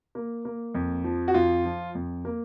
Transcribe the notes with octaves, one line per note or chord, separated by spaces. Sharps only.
A#3
A#3
F2
F3
F#4
F2 F4
F3
F2
A#3